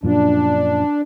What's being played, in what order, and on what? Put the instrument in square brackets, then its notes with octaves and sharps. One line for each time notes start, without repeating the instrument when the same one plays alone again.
[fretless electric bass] F#2 A#2 F3 [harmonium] D4